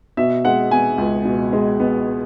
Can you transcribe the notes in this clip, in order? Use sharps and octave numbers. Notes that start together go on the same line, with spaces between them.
B2 E5
G#3 F#5
B3 G#5
C#2
B2
G#3
B3